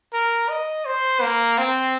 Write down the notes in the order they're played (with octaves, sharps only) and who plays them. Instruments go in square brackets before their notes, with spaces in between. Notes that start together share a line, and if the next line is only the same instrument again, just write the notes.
[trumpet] A#4
D#5
C5
A#3
C4